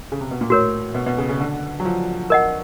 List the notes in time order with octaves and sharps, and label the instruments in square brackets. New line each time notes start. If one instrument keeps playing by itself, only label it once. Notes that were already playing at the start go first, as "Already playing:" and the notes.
[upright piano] C#3
C3
B2
A#2
[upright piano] A2 [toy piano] F#4 A#4 C#5
[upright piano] B2
B2
C#3
C#3
D3
F#3
F3
[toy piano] A#4 D#5 F#5